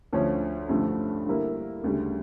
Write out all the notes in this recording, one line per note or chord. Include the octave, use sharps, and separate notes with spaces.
D2 D3 F3 C#4
A1 G2 D3 F3 A3
D3 G3 A#3 E4 A#4
D2 C#3 G3